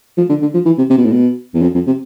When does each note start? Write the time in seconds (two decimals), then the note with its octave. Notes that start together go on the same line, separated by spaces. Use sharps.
0.17 F3
0.29 D3
0.41 D3
0.54 F3
0.66 E3
0.78 C3
0.90 C3
0.97 B2
1.05 A2
1.12 B2
1.54 E2
1.62 F2
1.74 F2
1.87 C3